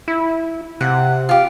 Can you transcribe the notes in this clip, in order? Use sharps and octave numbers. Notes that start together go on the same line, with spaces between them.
E4
C3 F#5
F4 G4